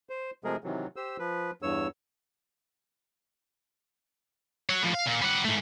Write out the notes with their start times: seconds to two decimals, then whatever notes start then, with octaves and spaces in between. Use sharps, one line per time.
0.09 C5
0.44 C3 F3 G#3 A3 G#4 A#4
0.64 C3 D#3 E3 F#3
0.96 G4 C5 E6
1.19 F3 B4
1.62 E2 G2 C#5 E6
4.69 C#5 F#5
4.83 A2 F3
4.95 F5
5.07 A#2
5.22 G3 F#5
5.45 G#2 A3